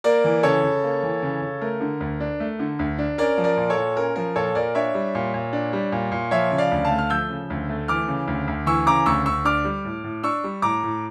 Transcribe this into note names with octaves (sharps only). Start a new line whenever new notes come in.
A#3 A#4 D5
E3
C#3 A4 C#5
C#3
A#3
E3
C#3
C#3
A3 A#4
D3
D2
D4
A3
D3
D2
D4
C#4 A#4 D5
F3
A#4 D5
A#2
A4 C#5
A#2
C#4 A#4
F3 A#4
A#2 A4 C#5
A#2 A#4 D5
D4 C#5 E5
G3
A#2
A#2
D4
G3
A#2
A#2
F3 C#5 E5
C#3
D5 F5
D2
F5 A5
A3
F6
F3 E6 G6
C#3
D2
A3
E3 D6 F6
C#3
D2
D2
E3 C#6 E6
C#3 A#5 D6
D2 C#6 E6
D2 C#6 E6
D4 D6 F6
G3
A2
A2
D4 C#6 E6
G3
A2 A#5 D6
A2